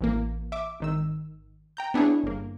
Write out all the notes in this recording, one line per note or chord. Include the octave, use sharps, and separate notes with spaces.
A1 E3 A#3
E5 D6
G#1 D#3 E6
G5 A#5 G6
B3 D4 E4 G#4 C#5
G1 A#3